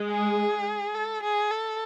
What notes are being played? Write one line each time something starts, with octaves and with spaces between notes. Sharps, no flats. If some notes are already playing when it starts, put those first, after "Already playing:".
Already playing: G#3
G#4
A4
G#4
A4